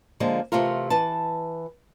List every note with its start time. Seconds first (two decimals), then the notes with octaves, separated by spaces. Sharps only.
0.20 D3 F3 G#3 A#3
0.52 C3 E3 A3 F4 A#4
0.90 E3 B4 A5